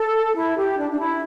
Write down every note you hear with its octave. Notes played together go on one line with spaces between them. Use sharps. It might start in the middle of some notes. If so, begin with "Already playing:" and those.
Already playing: A4
E4
G4
D4
D4
E4